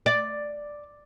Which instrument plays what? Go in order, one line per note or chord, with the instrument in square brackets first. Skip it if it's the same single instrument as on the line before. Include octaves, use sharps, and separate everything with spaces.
[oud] D5